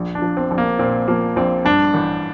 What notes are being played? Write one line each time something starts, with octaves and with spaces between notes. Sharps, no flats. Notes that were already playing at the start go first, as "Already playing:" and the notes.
Already playing: A#1
D4
F3
C4
A#1
A#3
A#2 C4
F3 A#3
A#1 C4
G2 D4
A1